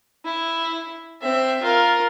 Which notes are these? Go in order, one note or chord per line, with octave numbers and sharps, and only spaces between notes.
E4
C4 E5
F4 A#4